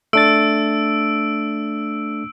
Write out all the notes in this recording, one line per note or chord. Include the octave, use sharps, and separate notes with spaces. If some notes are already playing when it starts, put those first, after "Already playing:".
A3 D4 E6 A6 D7